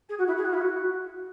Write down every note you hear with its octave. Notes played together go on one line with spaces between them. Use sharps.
G#4
F#4
E4
G#4
F#4
E4
F#4